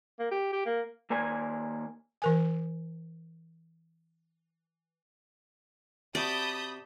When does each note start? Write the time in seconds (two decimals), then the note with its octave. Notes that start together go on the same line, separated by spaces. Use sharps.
0.19 A#3
0.31 G4
0.53 G4
0.66 A#3
1.10 D#2 A#3 D5 G#5
2.22 E3 A#4 G#5
6.15 C3 F#4 D5 A5 B5 D#6 G6